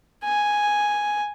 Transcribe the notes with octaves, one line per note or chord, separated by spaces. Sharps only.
G#5